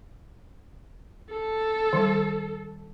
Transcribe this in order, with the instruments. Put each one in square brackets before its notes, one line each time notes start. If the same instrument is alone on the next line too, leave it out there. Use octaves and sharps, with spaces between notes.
[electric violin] A4
[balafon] D#3 G3